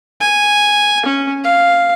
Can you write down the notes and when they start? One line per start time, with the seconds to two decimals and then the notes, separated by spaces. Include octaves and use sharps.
0.20 G#5
1.06 C#4
1.44 F5